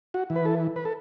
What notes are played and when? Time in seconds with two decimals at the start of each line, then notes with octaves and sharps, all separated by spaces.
0.14 F#4
0.30 E3
0.36 B4
0.45 A4
0.76 B4
0.85 A4